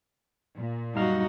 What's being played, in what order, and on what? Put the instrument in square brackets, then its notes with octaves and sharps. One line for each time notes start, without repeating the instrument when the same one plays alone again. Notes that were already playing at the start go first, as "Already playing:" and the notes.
[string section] A#2
[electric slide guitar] F#2 G3 F5 [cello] D#4 F#4